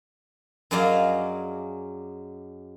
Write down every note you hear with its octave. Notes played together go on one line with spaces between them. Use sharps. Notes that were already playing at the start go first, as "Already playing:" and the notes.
F#2 F#3 G#4 D5 D#5 F5